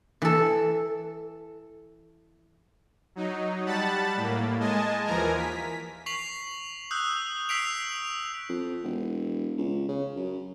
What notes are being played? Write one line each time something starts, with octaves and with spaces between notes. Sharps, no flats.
E3 A4
F#3 D#4
G3 F#5 A5 B5 A6
A2 A#3
G#3 D#5 G#5 A5
D#2 E3 F3 A#4 G#5 A#5
B6
C#6 B6 C7 F7 F#7
D#6 E6 F#6 G6
E6 B6 C7 D7 F7
F2
E1
C#2
C#3
F#2